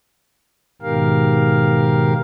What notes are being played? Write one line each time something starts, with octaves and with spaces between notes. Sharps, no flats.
G#2 B2 D#3 G4 A#4 F5